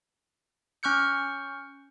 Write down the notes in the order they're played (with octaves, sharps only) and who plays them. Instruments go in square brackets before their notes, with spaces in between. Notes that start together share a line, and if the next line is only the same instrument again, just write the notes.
[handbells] C#4 C#6 F6 G6 C#7